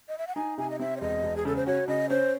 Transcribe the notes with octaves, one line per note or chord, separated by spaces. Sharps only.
D#5
E5
F#5
D#4 G#5
C3 G#5
D#5
C4 E5
C#5
E1 D#5
E1
G#4
C#3 A4
C5
F#4 C#5
C#3 D#5
C#4 C5